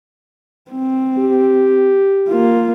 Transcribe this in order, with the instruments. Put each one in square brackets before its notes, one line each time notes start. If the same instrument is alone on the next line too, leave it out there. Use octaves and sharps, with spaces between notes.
[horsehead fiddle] C4
[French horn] G4
[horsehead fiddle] A#3 F4